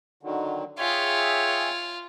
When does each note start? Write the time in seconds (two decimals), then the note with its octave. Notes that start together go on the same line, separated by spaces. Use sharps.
0.23 D3 D#3 F#3
0.79 F4 G#4 C#5 E5 G5